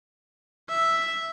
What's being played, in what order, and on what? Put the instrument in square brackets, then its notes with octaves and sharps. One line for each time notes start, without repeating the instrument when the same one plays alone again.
[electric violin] E5